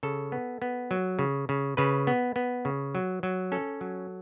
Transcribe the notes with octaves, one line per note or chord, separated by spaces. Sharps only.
C#3 A4
B3
B3
F#3
C#3
C#3
C#3 B4
B3
B3
C#3
F#3
F#3
C#4 A4
F#3